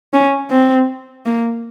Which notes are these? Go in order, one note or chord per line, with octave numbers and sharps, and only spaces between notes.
C#4
C4
A#3